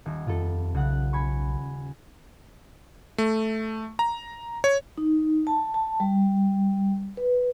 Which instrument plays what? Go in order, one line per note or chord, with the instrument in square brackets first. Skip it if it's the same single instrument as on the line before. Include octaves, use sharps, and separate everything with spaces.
[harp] D#1
[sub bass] F2 [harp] F4 A4
[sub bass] B1 [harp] C#3 F#5 F#6
[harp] G#5 B5 C#6
[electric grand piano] A3
A#5
C#5
[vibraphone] D#4
A5
A5
G3
B4